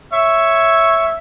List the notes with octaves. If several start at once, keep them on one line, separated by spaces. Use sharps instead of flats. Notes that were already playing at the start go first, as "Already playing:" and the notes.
C#5 E5